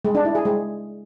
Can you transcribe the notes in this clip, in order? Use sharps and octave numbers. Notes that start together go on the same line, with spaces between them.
G#3
D4
E4
G#4
G#3